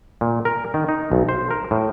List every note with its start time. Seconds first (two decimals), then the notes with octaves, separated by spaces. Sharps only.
0.21 A#2
0.45 A#4
0.74 D#3
0.88 D#4
1.12 B1
1.29 C5
1.51 A#4
1.71 A2